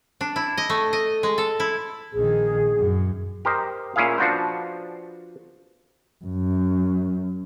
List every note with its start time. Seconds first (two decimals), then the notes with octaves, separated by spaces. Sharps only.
0.21 D4
0.36 E4
0.57 D#5
0.70 A3
0.93 D#5
1.23 G#3
1.38 A4
1.60 E4
2.13 A#1 D#3 G#4
2.76 F#2
3.45 G4 A#4 C5 D#5
3.96 A#2 C#4 E4 G#4 F5
4.18 F3 D4 F#4 B4 C5
6.24 F#2